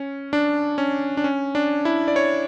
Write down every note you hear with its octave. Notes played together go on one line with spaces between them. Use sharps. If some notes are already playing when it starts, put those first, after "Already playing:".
Already playing: C#4
D4
C#4
D4
C#4
D4
E4
D5
C#5